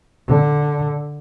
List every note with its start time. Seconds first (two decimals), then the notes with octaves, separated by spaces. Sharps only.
0.28 D3